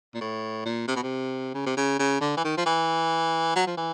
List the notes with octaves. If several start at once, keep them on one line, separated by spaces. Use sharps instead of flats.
A#2
A2
A#2
C3
B2
C3
C#3
C3
C#3
C#3
D3
E3
D#3
F3
E3
F#3
F3
E3